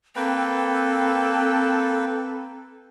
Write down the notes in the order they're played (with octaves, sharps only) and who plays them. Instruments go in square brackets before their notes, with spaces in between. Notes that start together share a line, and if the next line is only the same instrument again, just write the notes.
[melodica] A#3 B4 G5 [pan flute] C4 [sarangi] A4